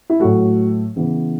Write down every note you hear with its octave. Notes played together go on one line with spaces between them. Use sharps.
E4
A2 F#3 A3 F#4
C#3 E3 B3